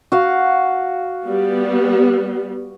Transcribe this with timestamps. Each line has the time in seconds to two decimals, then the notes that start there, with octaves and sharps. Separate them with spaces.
0.12 F#4 F5
1.27 G3 B3